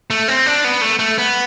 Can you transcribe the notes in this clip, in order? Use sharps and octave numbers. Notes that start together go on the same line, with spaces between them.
A3
C4
D4
B3
A3
A3
B3